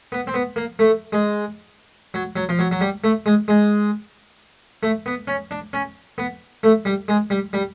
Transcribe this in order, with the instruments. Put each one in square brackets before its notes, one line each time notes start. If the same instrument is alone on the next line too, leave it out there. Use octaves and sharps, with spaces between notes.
[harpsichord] B3
C4
B3
A#3
A3
G#3
F#3
F#3
F3
F#3
F#3
G3
A3
G#3
G#3
A3
B3
C#4
D4
C#4
B3
A3
G3
G#3
G3
G3